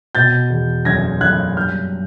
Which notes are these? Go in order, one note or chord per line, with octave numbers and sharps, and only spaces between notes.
B2 G6 A6
E2
F#1 G#6 A#6
F#1 F#6 G#6
G2 F6 G6